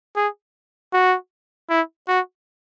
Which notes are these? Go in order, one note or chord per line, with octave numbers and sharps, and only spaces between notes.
G#4
F#4
E4
F#4